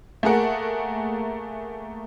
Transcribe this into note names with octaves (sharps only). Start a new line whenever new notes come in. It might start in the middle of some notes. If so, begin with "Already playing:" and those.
A3 A#3 G#4 A#4 F#5